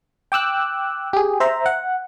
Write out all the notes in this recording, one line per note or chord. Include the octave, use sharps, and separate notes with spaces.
G5 D6 E6 F#6
G4 G#4
C5 E5 A#5
F#5